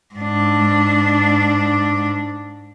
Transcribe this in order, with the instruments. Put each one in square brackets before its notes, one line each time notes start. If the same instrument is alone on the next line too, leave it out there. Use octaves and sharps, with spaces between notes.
[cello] G#2 D4